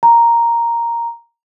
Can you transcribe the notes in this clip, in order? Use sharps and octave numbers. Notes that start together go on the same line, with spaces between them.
A#5